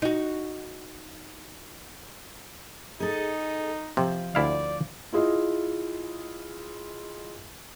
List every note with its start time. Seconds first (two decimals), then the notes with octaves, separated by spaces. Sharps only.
0.02 D#4 F#4
3.00 D#4 G#4 A4
3.97 C3 F3
4.35 D2 E4 D5 F5
5.13 E4 F4 G#4 D#5